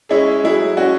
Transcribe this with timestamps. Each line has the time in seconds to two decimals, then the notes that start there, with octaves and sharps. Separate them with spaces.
0.09 G#3 C#4 E4 G#4
0.43 F#3 E4 G#4
0.77 G#3 C#4 F#4